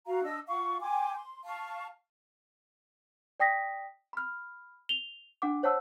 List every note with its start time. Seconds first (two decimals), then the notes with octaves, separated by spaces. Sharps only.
0.06 F#4 F5 A#5
0.23 D4 D#5 E6
0.47 F4 F5 F#5 C#6
0.80 G5 G#5 C6 D6
1.14 C6
1.45 F5 A5 C#6
3.40 D5 G5 D#6 A#6 B6
4.13 B5 F6
4.89 F7 G7
5.42 D4 F#5 D6
5.63 C5 C#5 F#5 A5 E6